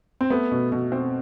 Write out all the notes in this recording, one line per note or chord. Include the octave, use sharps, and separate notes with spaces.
C4
A3 B3
B2
B2
C4